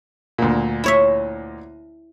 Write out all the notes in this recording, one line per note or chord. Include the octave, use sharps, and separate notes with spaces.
D2 A#2
E4 C#5 E5